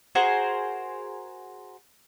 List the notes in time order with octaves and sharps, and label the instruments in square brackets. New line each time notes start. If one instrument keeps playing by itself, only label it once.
[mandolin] F#4 G#4 A#4 C5